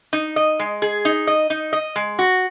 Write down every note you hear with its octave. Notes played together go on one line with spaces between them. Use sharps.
D#4
D#5
G#3
G#4
D#4
D#5
D#4
D#5
G#3
F#4